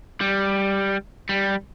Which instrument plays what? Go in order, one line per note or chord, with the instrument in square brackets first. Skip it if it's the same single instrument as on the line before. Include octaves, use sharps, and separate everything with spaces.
[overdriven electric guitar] G3
G3